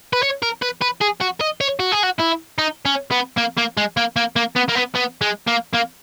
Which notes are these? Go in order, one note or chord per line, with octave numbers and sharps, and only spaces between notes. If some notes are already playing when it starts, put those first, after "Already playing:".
B4
C#5
A#4
B4
B4
G#4
F#4
D#5
C#5
F#4
G#4
F#4
E4
D#4
C#4
B3
A#3
A#3
G#3
A#3
A#3
A#3
B3
A#3
B3
B3
G#3
A#3
A#3